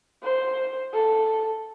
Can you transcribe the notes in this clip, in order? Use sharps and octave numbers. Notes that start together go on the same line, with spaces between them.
C5
A4